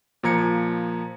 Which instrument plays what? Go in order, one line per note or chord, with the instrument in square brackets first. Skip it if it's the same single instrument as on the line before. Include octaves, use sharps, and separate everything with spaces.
[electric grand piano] A#2 F3 A#5 G#6 C#7